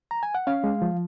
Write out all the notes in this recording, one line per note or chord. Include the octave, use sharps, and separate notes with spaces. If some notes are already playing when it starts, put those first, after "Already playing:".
A#5
G#5
F#5
C#4 F5
G#3
F3